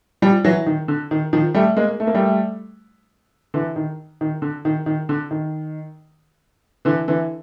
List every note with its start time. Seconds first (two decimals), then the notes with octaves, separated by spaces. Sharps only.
0.22 F3 G3
0.45 E3 F#3
0.66 D#3
0.88 D3
1.11 D#3
1.33 D#3 F3
1.54 G3 A3
1.77 G#3 A#3
2.00 A3
2.07 A#3
2.15 G3 A3
3.54 D3 E3
3.76 D#3
4.21 D#3
4.42 D3
4.65 D#3
4.86 D#3
5.09 D3
5.31 D#3
6.85 D3 E3
7.08 D3 E3